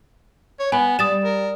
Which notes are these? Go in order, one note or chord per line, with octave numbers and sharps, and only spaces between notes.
C#5
B3 B4 G#5
G3 D5 D#6 A6 E7
A#4